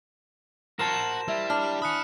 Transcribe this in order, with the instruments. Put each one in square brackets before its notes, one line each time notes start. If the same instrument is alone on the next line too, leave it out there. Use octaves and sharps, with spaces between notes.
[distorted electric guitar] F#4 [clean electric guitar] A#4 C5 A5 [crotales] E7
[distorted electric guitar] G3 [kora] E4
[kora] D4 [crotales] F6
[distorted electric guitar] G#5 B5 [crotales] D#6 F#6 C#7